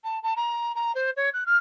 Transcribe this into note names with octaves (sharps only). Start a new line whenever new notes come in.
A5
A5
A#5
A#5
C5
C#5
F#6
F6